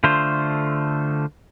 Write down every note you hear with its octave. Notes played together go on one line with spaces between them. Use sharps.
D3 A3 F4 C5 C6